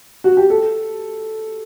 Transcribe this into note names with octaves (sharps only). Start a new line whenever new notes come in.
F#4
G4
A4